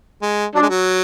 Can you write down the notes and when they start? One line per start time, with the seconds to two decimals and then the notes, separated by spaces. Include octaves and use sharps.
0.22 G#3
0.55 F#3 D4
0.62 G#3
0.69 F#3